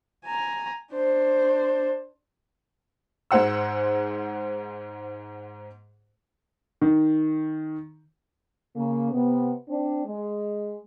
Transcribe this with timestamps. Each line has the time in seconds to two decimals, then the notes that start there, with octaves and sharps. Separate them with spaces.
0.25 G#5 A#5
0.93 D4 C5
3.31 G#2 G#3 C5 F#5 E6
6.81 D#3
8.76 C#3 A#3
9.12 C3 B3
9.69 C4 D4
10.06 G#3